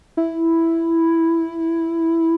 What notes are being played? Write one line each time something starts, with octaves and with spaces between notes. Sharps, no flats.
E4